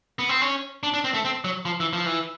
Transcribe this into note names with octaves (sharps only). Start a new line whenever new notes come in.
B3
C4
C#4
D4
D4
C4
A3
C4
F#3
F3
E3
F3
E3